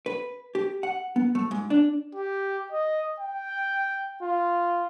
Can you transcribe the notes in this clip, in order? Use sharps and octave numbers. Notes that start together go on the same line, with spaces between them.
B4
G4
F#5
B3
A3
G#2
D4
G4
D#5
G5
F4